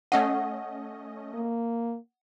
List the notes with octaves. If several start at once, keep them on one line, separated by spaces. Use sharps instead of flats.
A3 C#4 D#5 F#5
A#3